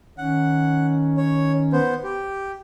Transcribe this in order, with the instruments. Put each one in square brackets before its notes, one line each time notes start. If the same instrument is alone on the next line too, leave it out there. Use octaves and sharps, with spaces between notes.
[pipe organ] D#3 C#4 [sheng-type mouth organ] F#5
[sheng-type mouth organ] C#5
B3 C5
G4